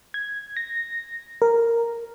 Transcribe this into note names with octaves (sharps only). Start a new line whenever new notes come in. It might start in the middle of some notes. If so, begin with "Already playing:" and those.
G#6
A#6
A#4